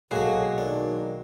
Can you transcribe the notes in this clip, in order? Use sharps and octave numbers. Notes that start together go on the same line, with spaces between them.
B1 F#3 G#3 A#3 F#4 G#4 A4
D#3 D4